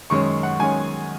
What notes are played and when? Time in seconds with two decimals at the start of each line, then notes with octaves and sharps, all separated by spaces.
0.10 F#2 D#3 G#3 C#4 C#6
0.43 F#5
0.59 F#2 D#3 G#3 C#4 G#5